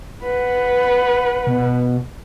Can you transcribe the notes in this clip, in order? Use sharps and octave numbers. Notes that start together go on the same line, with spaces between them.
B4 F#5
B2